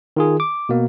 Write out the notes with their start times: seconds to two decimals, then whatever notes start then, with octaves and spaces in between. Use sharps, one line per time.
0.17 D#3 F4 G#4
0.40 D6
0.69 B2 A#3